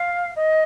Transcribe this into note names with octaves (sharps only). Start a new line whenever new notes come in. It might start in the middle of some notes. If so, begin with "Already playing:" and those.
Already playing: F5
D#5